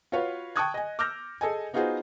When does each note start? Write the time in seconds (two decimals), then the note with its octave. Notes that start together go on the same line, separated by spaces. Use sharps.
0.12 F4 F#4 B4 C#5 F5
0.56 G5 A5 C#6 D#6 F#6 G#6
0.74 D#5 G#5
0.99 D6 E6 F6 G6 A#6
1.41 G#4 A4 D#5 G#5
1.73 B3 D#4 F4 F#4 G#4 C5